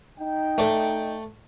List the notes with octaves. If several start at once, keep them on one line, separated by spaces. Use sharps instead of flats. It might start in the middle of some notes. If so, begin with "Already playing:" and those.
D#4 G5
A3 D5